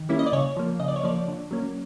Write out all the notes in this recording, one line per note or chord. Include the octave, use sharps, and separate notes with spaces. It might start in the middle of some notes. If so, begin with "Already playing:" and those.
Already playing: D#3
G3 A#3 C#4 E4
D#5
D5
C#3 C#5
F3 A#3
C#3 D#5
D5
C#5
F3 A#3 D5
D3
F#3 A#3 C#4